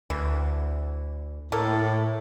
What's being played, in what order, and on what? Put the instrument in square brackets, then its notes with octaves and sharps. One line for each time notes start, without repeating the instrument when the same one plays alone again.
[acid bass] D2 [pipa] E3
[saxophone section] A2 [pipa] A#3 A4